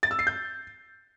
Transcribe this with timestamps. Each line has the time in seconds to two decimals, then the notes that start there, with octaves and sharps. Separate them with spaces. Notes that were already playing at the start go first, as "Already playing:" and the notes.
0.03 A6
0.11 E6
0.19 C7
0.27 G6